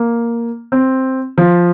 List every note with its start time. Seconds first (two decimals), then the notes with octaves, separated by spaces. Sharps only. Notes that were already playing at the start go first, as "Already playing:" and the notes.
Already playing: A#3
0.72 C4
1.38 F3